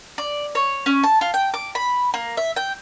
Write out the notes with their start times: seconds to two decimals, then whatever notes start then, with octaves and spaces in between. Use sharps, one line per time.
0.18 D5
0.55 C#5
0.86 C#4
1.03 A5
1.21 F4
1.34 G5
1.54 D6
1.75 B5
2.14 A#3
2.37 E5
2.56 G5